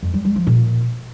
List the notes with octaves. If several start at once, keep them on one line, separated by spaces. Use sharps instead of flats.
F2
G3
G3
F3
A#2